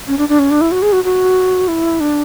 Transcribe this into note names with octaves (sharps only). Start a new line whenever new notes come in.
C#4
D4
D4
C#4
D4
E4
F#4
G#4
F#4
F#4
E4
D4